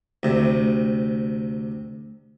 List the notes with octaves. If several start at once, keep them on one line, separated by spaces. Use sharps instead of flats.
D2 C3